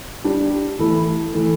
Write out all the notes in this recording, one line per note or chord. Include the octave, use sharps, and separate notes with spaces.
G3 D4 G4
E3 A3 E4 A4
E3 A3 E4 A4